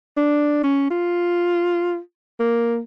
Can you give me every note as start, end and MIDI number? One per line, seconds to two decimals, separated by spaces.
0.17 0.61 62
0.63 0.87 61
0.90 1.98 65
2.40 2.79 58